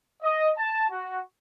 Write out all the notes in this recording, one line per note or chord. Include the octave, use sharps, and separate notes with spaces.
D#5
A5
F#4